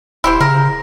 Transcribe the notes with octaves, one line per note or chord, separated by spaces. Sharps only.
D1 E4 G4 C5
C#3 A#4